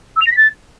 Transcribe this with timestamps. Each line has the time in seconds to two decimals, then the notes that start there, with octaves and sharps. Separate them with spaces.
0.16 E6
0.21 F7
0.26 A#6
0.31 B6
0.36 A6